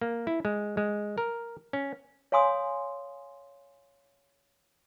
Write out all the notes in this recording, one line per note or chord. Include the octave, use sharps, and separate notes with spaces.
A#3
E4
G#3
G#3
A#4
C#4
C#5 F5 G#5 C6 D#6